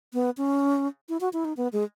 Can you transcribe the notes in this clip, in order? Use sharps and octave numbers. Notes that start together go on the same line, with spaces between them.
B3
C#4
E4
F#4
E4
D#4
B3
G#3